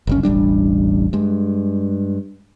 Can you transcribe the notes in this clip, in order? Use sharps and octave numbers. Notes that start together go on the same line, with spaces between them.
F#1 C2 C#4
E1 A1 G3 D4
G2 G#3